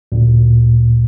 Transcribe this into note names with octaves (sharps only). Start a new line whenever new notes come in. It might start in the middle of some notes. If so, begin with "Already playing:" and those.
D2 A#2